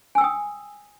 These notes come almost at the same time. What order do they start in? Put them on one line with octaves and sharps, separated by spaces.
G#5 E6 G5 D#6